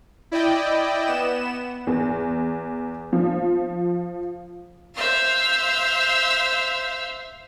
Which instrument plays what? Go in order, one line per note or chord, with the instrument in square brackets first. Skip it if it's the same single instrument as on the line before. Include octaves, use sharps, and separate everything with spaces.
[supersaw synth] E4 D5 D#5 G5
B3 E7
[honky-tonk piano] E2
F3
[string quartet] C5 E5 F5